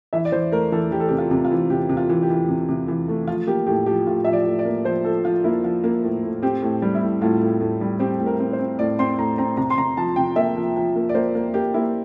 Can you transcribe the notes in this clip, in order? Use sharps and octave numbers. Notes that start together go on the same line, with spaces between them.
E3 E5
D5
E3 C5
A3 A#4
E3 A4
E3 G4
A4
C3 G4
F4
C3
F4
E3
C3 G4
C3
F4
E3
G4
E3
C3
C3
E3
A3
F3 F4
A#3 G4
A2 G4
F3 G4
A2 F4
F3 E5
D5
A2
D5
A#3
F3 C5
F3 A4
F3 F4
A#3 E4
F3 F4
A#3
A2
A2
C4 G4
A2
G3
E4
A2
A2 F4
A2
A2
G3
C4 G4
A2
A#4
C4
C5
C4
A2 D5
C4 C6
A2 A#5
C4 A#5
C3 A#5
C6
C3 A#5
F3 A5
C3 G5
A#3 E5
F3
F3
A#3
D5
A#3 C5
A#3
A#3 G4
A#3 E4